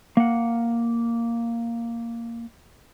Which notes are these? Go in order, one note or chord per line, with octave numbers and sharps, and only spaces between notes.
A#3 F#5